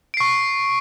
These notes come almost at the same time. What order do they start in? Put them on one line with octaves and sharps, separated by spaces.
D7 C7 C#6